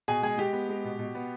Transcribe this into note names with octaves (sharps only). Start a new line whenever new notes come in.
B2 G#4 G#5
G#3 G#4 G#5
G#3 G4 G5
B3
G#3
B2
B2
B3